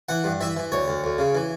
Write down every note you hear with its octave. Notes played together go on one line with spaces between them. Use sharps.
E3 F#5
G2
E3 E5
E3
D2 C#5
D2
D2
C#3
E3